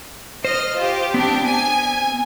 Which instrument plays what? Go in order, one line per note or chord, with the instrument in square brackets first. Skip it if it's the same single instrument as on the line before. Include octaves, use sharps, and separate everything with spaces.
[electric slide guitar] C5 [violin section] D#5 F6
[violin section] F4 G4
[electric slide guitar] B3 C4 [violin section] D4 G4
[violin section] G#5